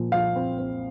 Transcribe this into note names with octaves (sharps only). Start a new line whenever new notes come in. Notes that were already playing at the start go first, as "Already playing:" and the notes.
Already playing: A#2 F3
F3 F5
C4
C4